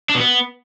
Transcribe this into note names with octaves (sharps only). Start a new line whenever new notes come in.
D4
B2
B3